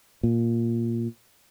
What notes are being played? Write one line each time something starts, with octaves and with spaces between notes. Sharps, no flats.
A#2